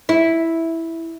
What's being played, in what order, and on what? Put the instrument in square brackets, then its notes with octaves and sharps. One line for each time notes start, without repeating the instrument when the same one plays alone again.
[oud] E4